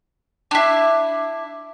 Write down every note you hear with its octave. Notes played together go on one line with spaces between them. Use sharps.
D4 E4